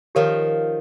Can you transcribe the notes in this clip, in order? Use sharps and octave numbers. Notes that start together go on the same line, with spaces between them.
D#3 F3 G4 A#4 C#5 F5